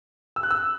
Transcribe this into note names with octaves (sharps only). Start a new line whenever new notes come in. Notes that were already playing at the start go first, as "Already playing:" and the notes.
E6
F#6
E6